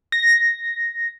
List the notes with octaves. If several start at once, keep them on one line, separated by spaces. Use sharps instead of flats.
A#6